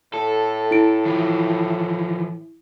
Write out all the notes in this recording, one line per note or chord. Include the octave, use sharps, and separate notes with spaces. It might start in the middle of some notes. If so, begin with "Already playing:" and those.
A2 A4
E4 D7
E3 F3